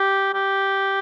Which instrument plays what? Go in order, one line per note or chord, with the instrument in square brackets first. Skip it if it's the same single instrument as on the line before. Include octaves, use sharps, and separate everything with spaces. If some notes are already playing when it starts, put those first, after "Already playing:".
Already playing: [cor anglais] G4
G4